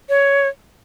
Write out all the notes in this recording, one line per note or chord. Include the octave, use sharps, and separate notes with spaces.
C#5